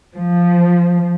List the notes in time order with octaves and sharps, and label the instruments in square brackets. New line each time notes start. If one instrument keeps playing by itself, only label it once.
[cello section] F3